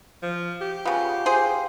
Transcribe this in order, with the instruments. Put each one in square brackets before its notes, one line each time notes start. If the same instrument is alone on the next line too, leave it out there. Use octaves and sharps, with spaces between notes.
[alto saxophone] F3
G4
[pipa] C#3 B3 [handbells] F4 F5 F#5
[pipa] G#4 C5
[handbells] F5 G5